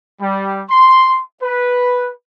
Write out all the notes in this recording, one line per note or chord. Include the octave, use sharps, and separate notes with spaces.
G3
C6
B4